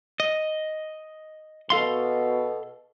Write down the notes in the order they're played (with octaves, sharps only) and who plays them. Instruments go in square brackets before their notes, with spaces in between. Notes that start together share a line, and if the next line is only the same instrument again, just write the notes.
[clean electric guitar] D#5
[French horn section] B2 [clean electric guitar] A4 F5 C6